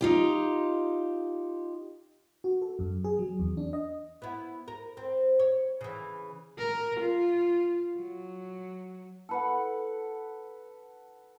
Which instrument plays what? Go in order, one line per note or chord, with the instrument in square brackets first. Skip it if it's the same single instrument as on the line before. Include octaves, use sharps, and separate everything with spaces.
[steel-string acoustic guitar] D#4 F4 G4
[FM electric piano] F#4
A4
F#2
G#4
F#3
E2
D4
D#5
[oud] B3 E4
A#4
C4
C#5
C#3 E3
[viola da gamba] A#4
F4
F#3
[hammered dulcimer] A4 B4 F#5